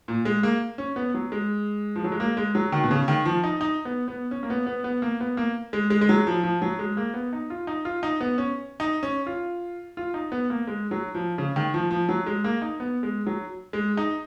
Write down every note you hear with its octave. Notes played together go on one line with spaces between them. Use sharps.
A#2
G#3
A#3
C#4
B3
F#3
G#3
F3
F#3
G#3
A#3
G#3
F#3
D#3
B2
C#3
D#3
F3
D#4
D#4
B3
B3
C#4
A#3
B3
B3
B3
A#3
B3
A#3
G#3
G#3
G#3
F#3
F3
F3
F#3
G#3
A#3
B3
D#4
F4
D#4
F4
D#4
B3
C#4
D#4
C#4
F4
F4
D#4
B3
A#3
G#3
F#3
F3
C#3
D#3
F3
F3
F#3
G#3
A#3
D#4
B3
G#3
F#3
G#3
D#4